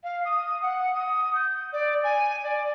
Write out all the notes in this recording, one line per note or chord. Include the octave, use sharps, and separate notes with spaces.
F5
D#6
F#5
D#6
G6
D5
G#5
D5